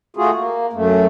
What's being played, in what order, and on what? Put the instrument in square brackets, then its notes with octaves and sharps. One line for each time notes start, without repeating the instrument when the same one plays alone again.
[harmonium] A3 F4 F#4 G#4
A#3
F#2 A3